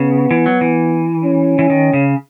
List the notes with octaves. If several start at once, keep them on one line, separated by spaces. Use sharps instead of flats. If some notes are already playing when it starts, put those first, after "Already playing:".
Already playing: C#3 B3
E3
F#3
E3
C#4
E3
D#3
C#3